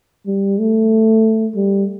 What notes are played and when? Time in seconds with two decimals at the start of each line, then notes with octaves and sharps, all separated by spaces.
0.26 G3
0.59 A3
1.56 G3